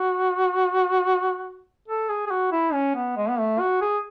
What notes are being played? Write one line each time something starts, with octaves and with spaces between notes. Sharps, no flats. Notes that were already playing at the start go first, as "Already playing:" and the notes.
Already playing: F#4
A4
G#4
G#4
F#4
E4
C#4
B3
G#3
B3
A3
F#4
G#4